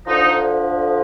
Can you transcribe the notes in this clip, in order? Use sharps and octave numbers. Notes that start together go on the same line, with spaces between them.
D2 D3 F3 D#4